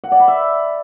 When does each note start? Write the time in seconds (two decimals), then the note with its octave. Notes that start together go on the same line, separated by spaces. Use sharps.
0.04 F#5
0.12 D5
0.20 B5
0.28 E5